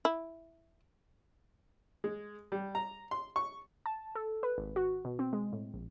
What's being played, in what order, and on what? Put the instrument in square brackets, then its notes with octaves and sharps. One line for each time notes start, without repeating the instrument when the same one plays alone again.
[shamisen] E4
[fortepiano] G#3
G3
A#5
C6
C#6
[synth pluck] A5
A4
B4
G#1
F#4
B2
C4
G#3
A2
A#1